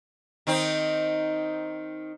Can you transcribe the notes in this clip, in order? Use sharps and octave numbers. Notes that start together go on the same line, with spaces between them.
D#3 C4 D#4